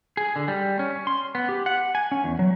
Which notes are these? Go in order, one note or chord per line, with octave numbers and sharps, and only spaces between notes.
G#4
D3
G3
C#4
C6
B3
G4
F#5
G#5
C#4
E2
F#3